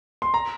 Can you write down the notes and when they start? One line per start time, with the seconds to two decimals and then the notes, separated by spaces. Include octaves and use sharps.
0.22 C6
0.34 A#5